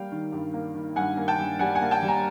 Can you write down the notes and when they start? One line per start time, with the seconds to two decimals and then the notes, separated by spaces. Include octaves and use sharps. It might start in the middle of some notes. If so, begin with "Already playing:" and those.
Already playing: G3 A#3 F5 G5
0.12 D#3
0.32 G2
0.54 A#3
0.75 D#3
0.96 G2 F#5 G#5
1.17 A#3
1.28 G5 A5
1.39 G2
1.59 G3 F#5 G#5
1.75 F#5 G#5
1.82 A#3
1.91 G5 A5
2.03 G3
2.08 G#5 A#5